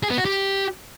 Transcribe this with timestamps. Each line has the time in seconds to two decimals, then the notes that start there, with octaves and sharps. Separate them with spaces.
0.03 G#4
0.10 B3
0.18 F#4
0.25 G4